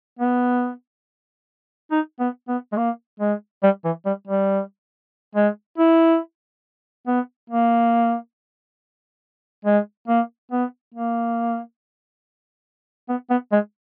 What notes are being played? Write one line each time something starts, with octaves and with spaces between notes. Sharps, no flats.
B3
D#4
B3
B3
G#3
A#3
G#3
G3
E3
G3
G3
G#3
E4
B3
A#3
G#3
A#3
B3
A#3
B3
B3
G#3